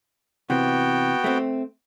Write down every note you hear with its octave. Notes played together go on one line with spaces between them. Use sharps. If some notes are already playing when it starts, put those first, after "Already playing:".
C3 E3 B3 F#4 G5
A3 C4